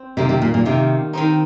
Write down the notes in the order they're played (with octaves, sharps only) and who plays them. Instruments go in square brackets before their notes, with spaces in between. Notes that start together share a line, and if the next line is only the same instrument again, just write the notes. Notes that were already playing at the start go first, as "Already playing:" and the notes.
Already playing: [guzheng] C4
[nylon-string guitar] C3 [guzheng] D#3 A#3 F4
[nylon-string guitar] C3
A#2
A#2
[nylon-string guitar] C3 [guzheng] D#3 A#3 F4
[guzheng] D#3 C4 D#4